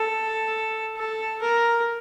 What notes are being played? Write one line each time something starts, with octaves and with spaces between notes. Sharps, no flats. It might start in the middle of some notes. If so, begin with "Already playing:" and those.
Already playing: A4
A4
A#4